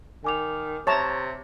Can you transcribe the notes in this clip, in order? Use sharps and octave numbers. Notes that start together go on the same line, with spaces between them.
D#3 G#5 D6 F7
C3 C#5 E5 A5 A#5 C#6 A6